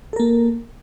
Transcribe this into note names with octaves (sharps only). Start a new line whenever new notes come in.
A#3 A4 A#4